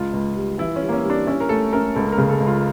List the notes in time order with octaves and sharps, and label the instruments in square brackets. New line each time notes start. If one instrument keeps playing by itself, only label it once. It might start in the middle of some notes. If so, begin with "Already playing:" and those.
Already playing: [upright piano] C#2 [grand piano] F4
[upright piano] C#2
G3
[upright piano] E3 [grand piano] E4
[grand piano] C#4
[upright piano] G3
[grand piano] A#3
C#4
[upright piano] G3
[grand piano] D4
[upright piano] C#4 [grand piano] E4
[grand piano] A#4
[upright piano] A3 [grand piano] A4
[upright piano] C#4 [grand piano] A#4
[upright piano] C#2 [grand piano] A4
[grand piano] A#4
[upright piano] C#3
[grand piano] A4
[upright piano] C#2
[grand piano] F4